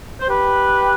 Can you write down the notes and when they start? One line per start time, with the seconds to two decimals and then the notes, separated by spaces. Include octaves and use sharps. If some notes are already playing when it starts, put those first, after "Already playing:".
0.20 C5
0.29 G4 B4